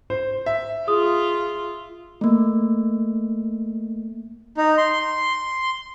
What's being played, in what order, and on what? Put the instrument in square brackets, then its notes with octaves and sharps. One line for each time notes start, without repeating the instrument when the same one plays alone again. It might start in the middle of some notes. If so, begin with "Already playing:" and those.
[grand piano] C5
E5
[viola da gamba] F4 [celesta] G#4 D#6
[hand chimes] A3 A#3
[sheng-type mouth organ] D#4
C6